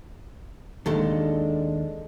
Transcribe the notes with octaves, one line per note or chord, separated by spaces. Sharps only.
D#2 D#3 G#3 D4 A4 A5